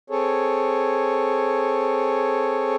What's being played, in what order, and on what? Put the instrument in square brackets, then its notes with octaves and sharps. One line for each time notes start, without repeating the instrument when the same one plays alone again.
[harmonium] C4 G#4 A4 C#5